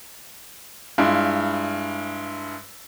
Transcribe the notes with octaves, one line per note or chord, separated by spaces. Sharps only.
G2 G#3 E4 F4